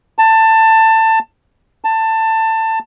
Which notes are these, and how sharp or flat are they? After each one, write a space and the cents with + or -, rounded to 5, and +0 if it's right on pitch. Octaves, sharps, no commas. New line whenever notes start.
A5 +20
A5 +20